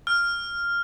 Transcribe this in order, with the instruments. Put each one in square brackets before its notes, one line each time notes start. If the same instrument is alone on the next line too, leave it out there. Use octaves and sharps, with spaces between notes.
[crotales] F6